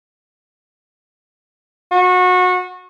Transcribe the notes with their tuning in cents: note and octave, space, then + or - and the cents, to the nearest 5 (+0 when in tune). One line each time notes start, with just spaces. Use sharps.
F#4 -25